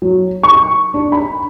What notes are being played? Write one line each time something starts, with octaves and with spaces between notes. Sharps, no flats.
F#3
C#6
D4
B5